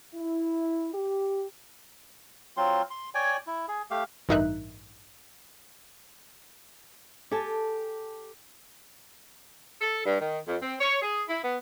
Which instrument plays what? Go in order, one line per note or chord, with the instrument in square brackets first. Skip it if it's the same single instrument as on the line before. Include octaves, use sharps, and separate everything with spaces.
[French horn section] E4
G4
[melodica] F#3 C4 F4 C6
C6
C#5 D5 G5 G#5
E4
G#4
A3 G4 F5
[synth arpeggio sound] A1 G2 D#4 A#4 E5 F#6
[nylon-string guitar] G4 A4 G#5 A5
[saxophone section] A4
G2
D#3
F2
C4
C#5
G#4
E4
B3